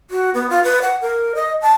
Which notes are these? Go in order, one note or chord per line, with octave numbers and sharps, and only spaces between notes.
F#4
B3
F4
B4
F#5
A#4
D#5
A5